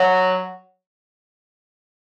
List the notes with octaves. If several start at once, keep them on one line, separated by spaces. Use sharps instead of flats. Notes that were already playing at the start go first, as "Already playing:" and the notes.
Already playing: F#3